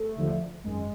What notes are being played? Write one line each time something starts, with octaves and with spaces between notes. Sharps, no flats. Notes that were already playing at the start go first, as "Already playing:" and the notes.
Already playing: A3
D#2 D3 F3
G#1 F#2 D#3 G#3